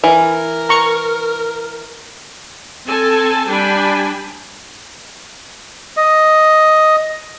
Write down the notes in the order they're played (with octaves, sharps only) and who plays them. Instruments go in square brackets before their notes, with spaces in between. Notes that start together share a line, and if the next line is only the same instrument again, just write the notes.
[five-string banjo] E3 [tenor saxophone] A#4
[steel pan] A#5 C#6
[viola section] C4 A4 G#5 A5
G3 D4 G5 G#5 B5
[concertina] D#5